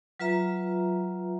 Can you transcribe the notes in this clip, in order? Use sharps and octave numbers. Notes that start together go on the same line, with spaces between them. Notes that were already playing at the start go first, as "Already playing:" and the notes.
F#3 F4 B4 E5 A#5